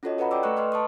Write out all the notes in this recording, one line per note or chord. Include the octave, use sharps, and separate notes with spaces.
C#4 F4 F#4 A4 C#5 D#5
A4 B4 D#5 F#5 A#5 B5
D5 G5 D6 E6
A3 A4 B4 C#6 F#6
B4 D#5 C6 F6
A5 C6 C#6 D#6